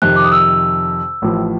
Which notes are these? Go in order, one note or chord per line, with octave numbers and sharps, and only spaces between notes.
F2 C3 D#3 F#6
D6
D#6
E6
A1 A2 F3